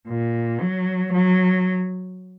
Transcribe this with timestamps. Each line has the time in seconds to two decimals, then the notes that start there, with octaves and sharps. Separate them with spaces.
0.09 A#2
0.61 F#3
1.14 F#3